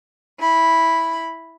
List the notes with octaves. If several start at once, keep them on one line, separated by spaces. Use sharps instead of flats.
E4 B5